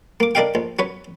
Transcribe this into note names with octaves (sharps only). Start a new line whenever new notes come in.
A#3 D6
D4 A#4 D5 D#5 F5 G5
A#1
F#3 B4 C#5